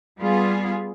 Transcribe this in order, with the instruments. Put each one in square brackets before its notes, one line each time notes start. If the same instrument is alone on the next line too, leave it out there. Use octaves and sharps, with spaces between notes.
[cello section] G3 B3 F4 G#4